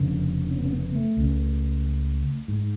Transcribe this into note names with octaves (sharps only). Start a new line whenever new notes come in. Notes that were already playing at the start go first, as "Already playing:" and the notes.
Already playing: F1 F2 C#3 D4
C#4
B3
C#4
B3
A3
C#2 C#3
G#2